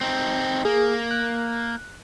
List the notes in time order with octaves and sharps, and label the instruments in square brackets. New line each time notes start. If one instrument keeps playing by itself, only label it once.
[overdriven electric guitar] C4 D#4
[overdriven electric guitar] A#3 [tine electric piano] G#4
[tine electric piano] F#6